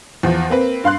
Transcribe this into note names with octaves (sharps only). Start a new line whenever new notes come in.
E2 F3
A#3 C4 B4
G2 F5 C6 F#6